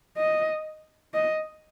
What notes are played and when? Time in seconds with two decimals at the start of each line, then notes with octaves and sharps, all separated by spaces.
0.17 D#5
1.14 D#5